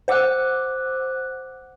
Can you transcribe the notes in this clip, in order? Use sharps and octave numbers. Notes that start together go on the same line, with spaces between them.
C5 F#5 D6 E6 F#6